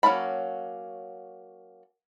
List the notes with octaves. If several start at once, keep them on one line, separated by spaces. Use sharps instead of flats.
F#3 A#3 C#4 A5 B5